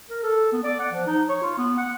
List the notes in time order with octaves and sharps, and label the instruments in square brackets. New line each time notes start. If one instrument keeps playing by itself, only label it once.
[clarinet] A#4
A4
B3
D5
F#5
F3
D#4
C#5
F4
B3
F#5